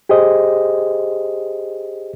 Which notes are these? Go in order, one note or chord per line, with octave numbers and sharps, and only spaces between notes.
G4 G#4 C5 D#5